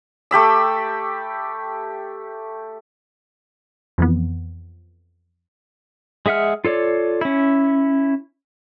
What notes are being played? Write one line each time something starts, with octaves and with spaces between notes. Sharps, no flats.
A3 G4 B5 E6
F2 E3 B3
G#3 G#4 E5 F#5 F6
F4 A4 C#5 D5
C#4 E4